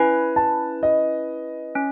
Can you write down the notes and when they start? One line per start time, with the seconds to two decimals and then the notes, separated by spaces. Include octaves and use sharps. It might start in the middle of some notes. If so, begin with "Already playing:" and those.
Already playing: C#4 E4 B4 G#5
0.36 A5
0.83 D#5
1.75 C#4